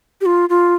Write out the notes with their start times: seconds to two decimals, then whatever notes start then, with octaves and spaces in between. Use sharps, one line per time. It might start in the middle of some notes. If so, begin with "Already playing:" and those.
0.21 G4
0.26 F4
0.49 F4